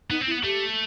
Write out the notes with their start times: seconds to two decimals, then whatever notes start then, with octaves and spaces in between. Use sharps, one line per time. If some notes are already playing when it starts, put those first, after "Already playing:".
0.10 B3 D#4
0.21 C4
0.27 E4
0.31 B3
0.44 A3 G4